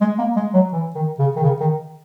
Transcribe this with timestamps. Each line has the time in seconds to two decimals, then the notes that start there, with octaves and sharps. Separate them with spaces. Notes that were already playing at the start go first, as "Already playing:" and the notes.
0.01 G#3
0.18 A#3
0.36 G#3
0.54 F#3
0.72 E3
0.95 D#3
1.19 C#3
1.36 D#3
1.43 C#3
1.60 D#3